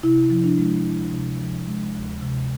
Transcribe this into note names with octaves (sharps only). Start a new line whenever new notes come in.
C3 E4
F3
D4
G#3
D2 E4
C3
F3
G#3
D2
C3